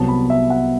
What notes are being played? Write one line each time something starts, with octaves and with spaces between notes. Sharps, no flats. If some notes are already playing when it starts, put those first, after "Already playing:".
Already playing: C2 C3 F#3 B3 A5
B5
E5
F#5